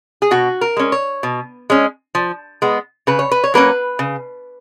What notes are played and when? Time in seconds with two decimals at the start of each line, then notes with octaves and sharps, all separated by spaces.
0.22 G#4
0.31 B2 F#4
0.61 A#4
0.77 G#3 C#4
0.92 C#5
1.23 B2
1.70 G#3 C#4
2.15 F3
2.62 G#3 B3
3.07 C#3 B4
3.19 C#5
3.31 B4
3.44 C#5
3.54 F#3 A#3 C#4 B4
3.99 C#3